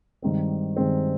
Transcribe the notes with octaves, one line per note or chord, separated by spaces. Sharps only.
G2 D#3 G#3 C4
G2 D#3 G#3 C4